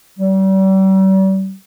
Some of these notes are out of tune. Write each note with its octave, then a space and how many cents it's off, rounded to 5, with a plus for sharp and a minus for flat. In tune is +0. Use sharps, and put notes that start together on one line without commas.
G3 -40